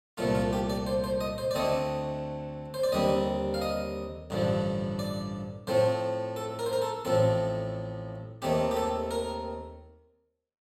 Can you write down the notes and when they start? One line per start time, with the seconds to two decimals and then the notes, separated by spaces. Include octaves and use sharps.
0.17 C2 A#2 F3 A3 F4
0.35 F4
0.53 G4
0.70 D5
0.87 C5
1.04 C5
1.21 D#5
1.38 C5
1.51 D5
1.55 D2 D3 A3 C4 D#5
2.74 C5
2.83 D5
2.92 D#2 D3 G3 C4 D#5
3.54 F5
3.62 D#5
4.30 A1 G2 D3 F3
4.99 D5
5.67 A2 F3 A3 C4 C5
6.36 A4
6.59 A#4
6.66 C5
6.73 A#4
6.82 A4
7.05 A1 A2 F3 C4 A4
8.42 D#2 D#3 A3 C4 G4
8.71 G4
8.77 A4
9.11 A#4